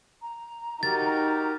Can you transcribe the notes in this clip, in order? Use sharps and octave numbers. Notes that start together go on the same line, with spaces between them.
A#5
D#4 F#4 G4 A#4 A6